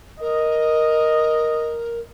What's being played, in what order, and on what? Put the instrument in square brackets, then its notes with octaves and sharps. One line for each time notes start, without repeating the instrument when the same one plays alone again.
[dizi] A#4 [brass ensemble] D#5